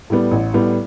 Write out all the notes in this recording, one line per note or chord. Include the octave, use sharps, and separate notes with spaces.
A2 G3 B3
A1
A2 G3 B3